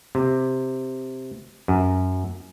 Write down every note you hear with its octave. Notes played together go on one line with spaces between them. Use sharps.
C3
F#2